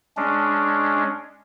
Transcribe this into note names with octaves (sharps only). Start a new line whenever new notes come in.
G#3 C#4 D4